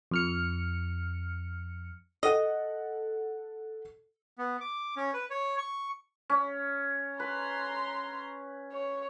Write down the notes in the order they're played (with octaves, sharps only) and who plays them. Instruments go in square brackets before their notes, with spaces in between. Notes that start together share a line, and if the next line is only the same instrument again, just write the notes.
[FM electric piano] F2 F6 C#7
[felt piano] A4 F#5 [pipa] D#5
[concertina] B3
D6
C#4
B4
C#5
C#6
[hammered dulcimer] C#4
[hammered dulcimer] B4 [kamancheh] A#5 C6
[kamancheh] C#5